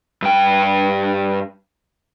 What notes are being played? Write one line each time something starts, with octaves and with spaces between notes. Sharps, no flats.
G2 G5